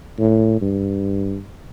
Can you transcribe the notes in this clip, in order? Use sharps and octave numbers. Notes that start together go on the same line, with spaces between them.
A2
G2